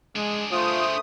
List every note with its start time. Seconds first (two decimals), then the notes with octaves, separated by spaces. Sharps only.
0.16 G#3 D4 G#4
0.52 A3 F4 C5 D#6